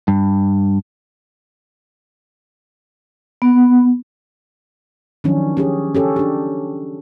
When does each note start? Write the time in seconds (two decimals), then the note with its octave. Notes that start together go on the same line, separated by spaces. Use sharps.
0.08 G2
3.42 B3
5.24 D#3 F3 F#3 C#4 D4
5.57 C#4 G4 G#4
5.95 C#4 G4 A4
6.16 D4 G4